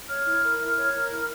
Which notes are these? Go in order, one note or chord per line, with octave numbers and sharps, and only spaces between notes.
C#5 F6
E4
A#4
E4
C#5
A#4
E4